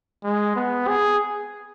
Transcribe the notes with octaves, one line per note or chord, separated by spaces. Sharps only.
G#3
B3
G#4